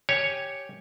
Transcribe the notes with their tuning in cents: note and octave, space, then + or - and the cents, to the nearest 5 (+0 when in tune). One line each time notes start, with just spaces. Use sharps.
G4 +0 C#5 +0 G#5 +0